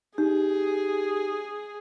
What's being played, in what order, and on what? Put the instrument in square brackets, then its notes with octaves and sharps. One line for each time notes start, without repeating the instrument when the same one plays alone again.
[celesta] D#4 [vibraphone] G4 [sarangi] G#4